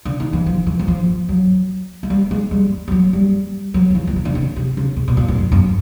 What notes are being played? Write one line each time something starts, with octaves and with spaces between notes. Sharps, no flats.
D3
D#3
E3
F3
E3
F#3
F3
F#3
G#3
G3
G#3
G3
G3
F#3
G3
F#3
F3
E3
E3
D#3
D3
C#3
C3
C#3
C3
B2
A#2
A2
F#2
F#2